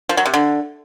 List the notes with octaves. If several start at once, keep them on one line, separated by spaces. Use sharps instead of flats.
F3
F#3
C3
D3